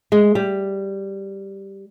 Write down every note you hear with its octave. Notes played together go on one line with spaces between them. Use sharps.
G#3
G3